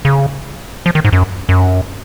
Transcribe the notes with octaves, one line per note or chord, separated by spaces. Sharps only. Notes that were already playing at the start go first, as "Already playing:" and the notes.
C#3
F3
D#3
G#2
F#2
F#2